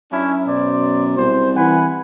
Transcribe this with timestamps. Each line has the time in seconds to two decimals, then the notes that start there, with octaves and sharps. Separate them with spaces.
0.12 F#2 C#4 D4 E4
0.48 B2 C5 D5
1.17 C2 C5
1.56 E3 F#5 G#5 B5